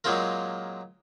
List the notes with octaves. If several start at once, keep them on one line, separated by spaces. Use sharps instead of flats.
A#2 F#3 G#3 C4 F4 A#4